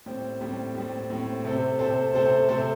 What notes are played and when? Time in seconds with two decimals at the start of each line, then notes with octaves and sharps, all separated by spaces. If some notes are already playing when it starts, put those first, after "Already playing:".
0.06 A2 G3 C4
0.41 A2 G3 C4
0.75 A2 G3 C4
1.10 A2 G3 C4
1.44 C3 A3 C4 A4 C5
1.79 C3 A3 C4 A4 C5
2.13 C3 A3 C4 A4 C5
2.48 C3 A3 C4 A4 C5